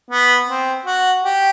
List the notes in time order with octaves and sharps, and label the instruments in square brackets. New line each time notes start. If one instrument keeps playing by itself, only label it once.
[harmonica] B3
C4
F#4
G4